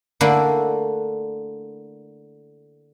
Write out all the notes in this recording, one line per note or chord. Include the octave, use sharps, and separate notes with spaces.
D3 A3 A#3 E4